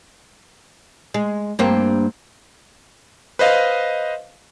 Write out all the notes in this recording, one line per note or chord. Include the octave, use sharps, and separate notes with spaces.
G#3
G2 A#3 C4
B4 C5 D#5 F5